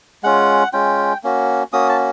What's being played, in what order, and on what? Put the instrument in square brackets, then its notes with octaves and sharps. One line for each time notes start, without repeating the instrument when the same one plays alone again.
[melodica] G#3 C#4 F4 F#5
G#3 C#4 F4 G5
A#3 C#4 F#4
A#3 C#4 F#4 D#6
A5